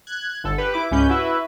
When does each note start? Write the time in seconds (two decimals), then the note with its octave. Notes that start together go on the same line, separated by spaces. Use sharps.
0.07 F#6 G#6
0.44 G1 D3 A4
0.58 G4 B4
0.74 E4 D6
0.91 C#2 G#2 C#4 B4 G6
1.09 E4 F#4 B4 E5